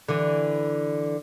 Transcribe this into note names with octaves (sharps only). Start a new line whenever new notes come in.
D3 E3